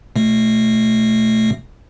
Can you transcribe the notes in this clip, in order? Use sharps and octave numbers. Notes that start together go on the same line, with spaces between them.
B2 A3